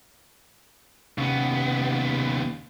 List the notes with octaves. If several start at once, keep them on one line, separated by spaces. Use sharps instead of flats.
D#2 C3 B3 C#4